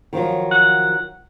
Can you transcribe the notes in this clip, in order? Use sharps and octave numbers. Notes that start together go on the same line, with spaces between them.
D#3 F3 F#3
F#5